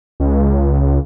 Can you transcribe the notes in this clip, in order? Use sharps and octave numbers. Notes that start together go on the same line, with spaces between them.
C#2